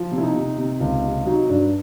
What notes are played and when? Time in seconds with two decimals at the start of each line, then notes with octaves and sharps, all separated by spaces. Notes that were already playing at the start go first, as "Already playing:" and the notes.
Already playing: F3
0.11 C3
0.18 E4
0.23 D#4
0.35 C3
0.58 C3
0.80 C#2
1.04 C3
1.26 F#3 D#4
1.49 G2 D4